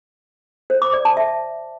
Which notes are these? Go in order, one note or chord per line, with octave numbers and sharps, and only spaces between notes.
C5
D6
D5
A5
E5